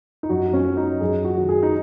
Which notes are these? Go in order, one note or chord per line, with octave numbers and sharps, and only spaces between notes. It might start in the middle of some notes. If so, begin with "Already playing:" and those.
D#4
F#2 F#4
C#4
F#3
D#4
F#2 G#4
F#4
D#3 F#3
G#4
D#4